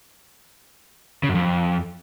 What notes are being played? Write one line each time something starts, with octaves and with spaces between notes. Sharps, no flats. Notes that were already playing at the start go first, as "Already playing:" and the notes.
C#3
F#2
F2